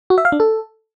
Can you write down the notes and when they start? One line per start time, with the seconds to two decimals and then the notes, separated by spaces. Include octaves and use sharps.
0.10 F#4
0.18 E5
0.25 F5
0.32 D4
0.40 A4